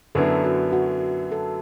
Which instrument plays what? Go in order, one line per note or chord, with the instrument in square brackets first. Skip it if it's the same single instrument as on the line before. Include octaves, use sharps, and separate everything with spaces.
[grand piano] F#2 D3 F#3 B3 E4 [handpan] A4
[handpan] F#4
F#4
A4